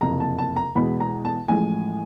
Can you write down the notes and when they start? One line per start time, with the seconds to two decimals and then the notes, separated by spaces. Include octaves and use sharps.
0.01 F#1 F2 C3 A#5
0.20 A5
0.38 A5
0.56 A#5
0.75 E2 B2 G#3 B5
1.00 A#5
1.25 A5
1.48 A1 A2 F3 G#3 G#5